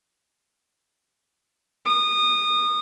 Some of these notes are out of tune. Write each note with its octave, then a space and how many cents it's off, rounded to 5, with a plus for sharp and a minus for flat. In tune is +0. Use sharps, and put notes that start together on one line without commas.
D#6 -25